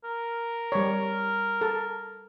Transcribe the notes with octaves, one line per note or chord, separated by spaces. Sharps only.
A#4
G3 C#5
A4